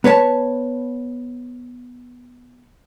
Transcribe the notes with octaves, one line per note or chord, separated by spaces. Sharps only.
B3 B4 C#5 A5